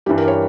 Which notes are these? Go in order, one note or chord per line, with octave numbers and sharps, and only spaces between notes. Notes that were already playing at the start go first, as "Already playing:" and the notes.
G2 E3 G3 G4
A#4
C#5